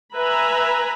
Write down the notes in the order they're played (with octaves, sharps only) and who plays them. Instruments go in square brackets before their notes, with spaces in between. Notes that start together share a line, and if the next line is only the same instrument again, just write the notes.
[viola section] B4 E5 G#5 A#5 B5